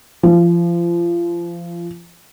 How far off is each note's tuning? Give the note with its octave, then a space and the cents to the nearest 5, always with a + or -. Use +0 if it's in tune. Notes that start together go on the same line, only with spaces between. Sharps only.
F3 -30